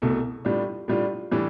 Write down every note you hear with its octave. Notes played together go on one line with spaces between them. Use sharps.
C2 B2 A3
A2 G3 D4 F4
A2 G3 D4 F4
A2 E3 G3 D4